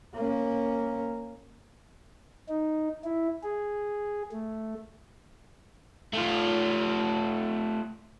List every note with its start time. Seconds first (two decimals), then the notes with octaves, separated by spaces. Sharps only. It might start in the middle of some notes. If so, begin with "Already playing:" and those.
0.15 A#3 C#4
2.49 D#4
3.04 E4
3.43 G#4
4.32 A3
6.13 A3 F4